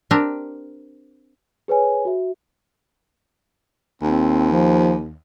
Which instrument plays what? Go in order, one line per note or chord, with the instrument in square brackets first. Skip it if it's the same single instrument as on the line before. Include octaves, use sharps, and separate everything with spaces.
[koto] C4 D4 G4 A#4
[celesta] G#4 B4 C#5 G#5
F#4 E5
[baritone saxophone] D#2 [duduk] C4
[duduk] F3